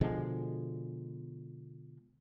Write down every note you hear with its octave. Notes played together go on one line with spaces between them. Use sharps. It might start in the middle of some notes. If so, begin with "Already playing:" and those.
B2 D3 F3 G#3